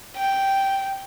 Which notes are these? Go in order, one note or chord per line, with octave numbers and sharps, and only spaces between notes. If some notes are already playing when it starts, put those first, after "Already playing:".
G5